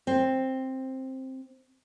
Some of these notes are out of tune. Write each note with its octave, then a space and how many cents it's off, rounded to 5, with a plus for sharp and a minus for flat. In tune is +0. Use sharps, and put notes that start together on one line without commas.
C4 +10